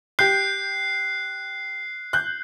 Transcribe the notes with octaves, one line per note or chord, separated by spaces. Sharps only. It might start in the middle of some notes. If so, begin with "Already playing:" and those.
G4 F#6 G6 C7
F#6 G6